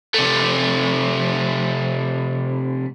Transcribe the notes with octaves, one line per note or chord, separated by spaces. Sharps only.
C3 A3